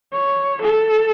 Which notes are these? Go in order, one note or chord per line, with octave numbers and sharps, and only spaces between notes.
C#5
A4